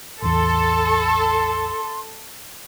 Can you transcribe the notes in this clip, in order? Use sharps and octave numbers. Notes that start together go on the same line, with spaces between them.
A1 E2 A4 C6